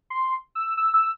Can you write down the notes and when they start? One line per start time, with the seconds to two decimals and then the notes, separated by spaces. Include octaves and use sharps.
0.10 C6
0.55 E6
0.77 E6
0.94 E6